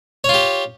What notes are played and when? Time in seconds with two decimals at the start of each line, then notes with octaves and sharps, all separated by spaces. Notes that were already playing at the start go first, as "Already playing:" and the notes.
0.24 C#5
0.29 F4
0.34 G4